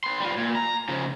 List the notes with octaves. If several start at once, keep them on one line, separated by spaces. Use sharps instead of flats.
B3 C6
G3 F4
A#2
A#5
C#3 F3